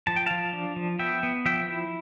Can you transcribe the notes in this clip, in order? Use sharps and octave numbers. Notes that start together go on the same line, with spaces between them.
F3 A5
G5
F3 F5 A5
D4
F3
B3 E5 G5
B3
F3 E5 G5
E4